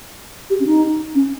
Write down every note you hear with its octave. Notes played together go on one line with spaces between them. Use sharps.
G4
C#4
D#4
C#4